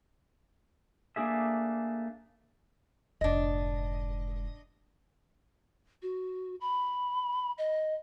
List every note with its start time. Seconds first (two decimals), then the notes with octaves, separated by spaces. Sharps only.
1.16 A3 A#3 D4 G#4 E5
3.21 F1 G#2 D4 D#5
6.02 F#4
6.61 B5
7.58 D#5